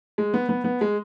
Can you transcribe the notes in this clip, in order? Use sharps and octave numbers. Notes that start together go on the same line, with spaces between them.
G#3
B3
B3
B3
G#3